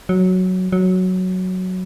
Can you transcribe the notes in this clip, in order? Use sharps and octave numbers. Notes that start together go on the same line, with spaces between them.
F#3
F#3